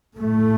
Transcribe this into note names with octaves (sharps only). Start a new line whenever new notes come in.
A2 A3